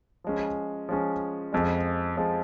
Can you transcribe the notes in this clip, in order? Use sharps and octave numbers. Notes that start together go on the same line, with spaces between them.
F3 G#3 C#4
F3 G#3 C#4
F2 F3 G#3
F2 F3 G#3